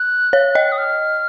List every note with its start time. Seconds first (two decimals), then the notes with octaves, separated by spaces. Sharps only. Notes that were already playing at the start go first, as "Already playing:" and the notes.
Already playing: F#6
0.33 C#5
0.55 D#5
0.72 D#6
0.78 F6